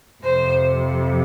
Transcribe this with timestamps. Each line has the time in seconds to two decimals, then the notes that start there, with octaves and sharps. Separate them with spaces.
0.22 F2 C3 F3 C5